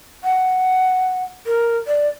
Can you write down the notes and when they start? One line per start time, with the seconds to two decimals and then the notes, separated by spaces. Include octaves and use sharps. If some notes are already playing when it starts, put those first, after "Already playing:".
0.24 F#5
1.46 A#4
1.87 D5